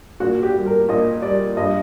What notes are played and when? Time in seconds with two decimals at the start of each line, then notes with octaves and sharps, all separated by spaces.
0.20 A#2 F#4
0.43 G4
0.55 G3
0.66 A#4
0.89 A#2 D#5
1.22 G3 D5
1.57 G2 D#5